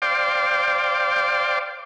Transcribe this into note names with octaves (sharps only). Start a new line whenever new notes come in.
C5 D5 F5 G5 C6 D6